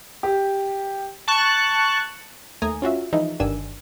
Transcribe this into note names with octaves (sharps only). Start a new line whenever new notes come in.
G4
A5 C#6 F#6
D#2 A3 G#5 A#5 D#6
C#4 F4 F#4 E5
E3 F3 G#3 D#4 E4
G1 G2 D#3 D4 G#5 E6